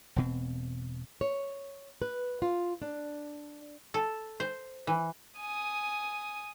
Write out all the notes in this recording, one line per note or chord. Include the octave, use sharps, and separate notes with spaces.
E1 B2 C4
C#5
B4
F4
D4
A4
C5
E3
G#5 D#6